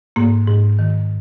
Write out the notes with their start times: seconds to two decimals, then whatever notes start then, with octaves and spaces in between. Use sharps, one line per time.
0.16 G#2 A#3
0.48 G#2
0.79 D#3